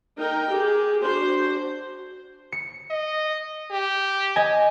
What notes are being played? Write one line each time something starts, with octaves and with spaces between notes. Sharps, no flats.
D#4 A#4 G5
G4 G#4
D4 F#4 C5
C#7
D#5
G4
D#5 G#5